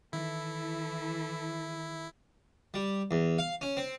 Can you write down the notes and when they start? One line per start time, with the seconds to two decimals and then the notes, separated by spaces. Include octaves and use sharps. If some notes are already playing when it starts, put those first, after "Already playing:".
0.13 D#3 E3 E4 A4
2.74 G3
3.11 E2
3.38 F5
3.61 C#4
3.77 C4